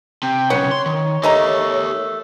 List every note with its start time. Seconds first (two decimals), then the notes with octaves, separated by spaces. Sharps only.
0.23 C3 G5
0.50 B1 C#3 B4 C#5 F#5 G5
0.71 C6
0.86 D#3
1.23 A3 G4 A#4 D#5 A#5